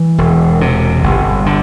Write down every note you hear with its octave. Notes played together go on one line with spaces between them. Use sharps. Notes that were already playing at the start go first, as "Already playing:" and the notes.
Already playing: E3
E1
C3
G1
D3